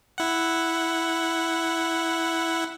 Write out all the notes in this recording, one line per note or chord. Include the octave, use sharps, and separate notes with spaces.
E4 F#5